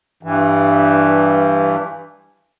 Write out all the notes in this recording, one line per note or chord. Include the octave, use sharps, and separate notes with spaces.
G2 E3